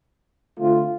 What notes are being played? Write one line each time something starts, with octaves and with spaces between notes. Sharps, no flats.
D3 A3 C4 F4